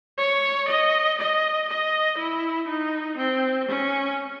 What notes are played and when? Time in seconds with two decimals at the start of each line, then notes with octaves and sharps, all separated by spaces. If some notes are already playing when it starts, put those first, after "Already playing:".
0.18 C#5
0.68 D#5
1.18 D#5
1.68 D#5
2.18 E4
2.68 D#4
3.17 C4
3.68 C#4